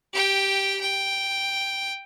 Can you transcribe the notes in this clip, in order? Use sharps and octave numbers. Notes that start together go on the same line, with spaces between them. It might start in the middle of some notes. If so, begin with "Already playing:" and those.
G4 G5
G5